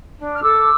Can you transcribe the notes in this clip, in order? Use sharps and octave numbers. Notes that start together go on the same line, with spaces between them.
D4
F6
A4 D6 E6